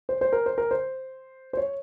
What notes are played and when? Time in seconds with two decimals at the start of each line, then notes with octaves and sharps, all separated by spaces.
0.09 C5
0.21 C5
0.32 A#4
0.46 C5
0.58 A#4
0.71 C5
1.53 C5
1.57 C#5